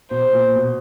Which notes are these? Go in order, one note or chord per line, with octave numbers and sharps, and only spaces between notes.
B2 C5
A#2
B2